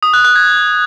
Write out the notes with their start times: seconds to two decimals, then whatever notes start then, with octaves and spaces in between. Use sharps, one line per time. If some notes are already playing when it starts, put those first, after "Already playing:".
0.03 D#6
0.14 F#6
0.25 F#6
0.36 G#6